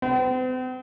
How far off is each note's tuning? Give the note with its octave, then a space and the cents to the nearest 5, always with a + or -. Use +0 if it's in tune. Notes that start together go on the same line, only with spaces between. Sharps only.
C4 -45